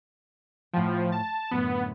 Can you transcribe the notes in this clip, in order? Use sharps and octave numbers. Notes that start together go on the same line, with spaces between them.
A2 F3 F#5 G5
A5
F#2 A2 D3 B3